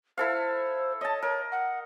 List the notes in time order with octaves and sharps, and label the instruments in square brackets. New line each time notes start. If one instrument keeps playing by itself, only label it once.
[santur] E4 A4 F5 [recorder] C5
[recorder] C#5 [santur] D#5 A5
[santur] A#4 [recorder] C#5
[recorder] F#5